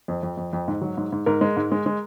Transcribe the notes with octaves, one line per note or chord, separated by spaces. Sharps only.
F2
F2
F2
F2
G#2
F#3
G#2
G#2
G#2 A#4
G#3
G#2
G#3
G#3